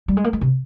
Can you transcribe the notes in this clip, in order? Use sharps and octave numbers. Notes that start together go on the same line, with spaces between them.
G3
G#3
A#3
G#3
C3